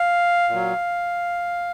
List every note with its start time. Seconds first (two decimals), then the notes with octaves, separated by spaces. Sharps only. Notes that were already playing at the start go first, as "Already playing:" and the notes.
Already playing: F5
0.49 A#2 F#3